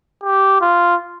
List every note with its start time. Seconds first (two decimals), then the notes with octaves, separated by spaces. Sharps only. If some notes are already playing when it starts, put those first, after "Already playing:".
0.24 G4
0.61 F4